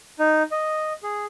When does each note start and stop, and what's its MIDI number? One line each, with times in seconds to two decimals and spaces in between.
0.19 0.43 63
0.52 0.93 75
1.03 1.25 68